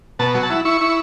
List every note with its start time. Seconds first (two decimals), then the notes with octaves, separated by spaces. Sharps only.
0.19 B2 A5
0.35 F#3
0.43 A5
0.50 E4
0.65 E4 C#6
0.81 E4